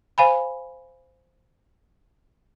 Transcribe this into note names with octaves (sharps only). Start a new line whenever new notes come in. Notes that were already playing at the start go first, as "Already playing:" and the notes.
C5 F5 G#5 B5